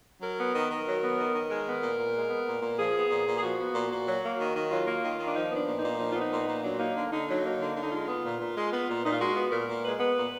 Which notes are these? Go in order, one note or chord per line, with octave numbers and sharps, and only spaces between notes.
F#3 A#4
B3
D#3
D#3
F#3
B3
D#3
D#3
G#3 A#4
B3
A#2
A#2
G#3
B3
A#2
A#2
F3 G#4
B3
A#2
A#2
G#4
F3 F#4
B3
A#2
A#2
F#3
A#3
D#3
D#3
F#3 F4
A#3
D#3
D#3
D4
F3 D#4
B3
D4
A#2
D#4
A#2
F3 D#4
F4
B3
D#4
A#2
A#2
F#3 D4
A#3 D#4
D3
D3 D#4
F#3 D#4
A#3
D3
D3
D#4
G#3 F4
B3
A#2
A#2
G#3
B3
A#2
A#2 D#4
F4
G#3 F#4
B3
A#2 A#4
A#2
G#3 B4
B3 B4
A#2